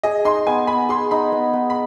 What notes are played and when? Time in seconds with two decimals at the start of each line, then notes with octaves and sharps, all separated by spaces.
0.03 G#4 D#5
0.25 D#4 C6
0.47 B3 G#5
0.67 B3 B5
0.89 G#4 C6
1.11 D#4 B5
1.32 B3
1.53 B3
1.70 B5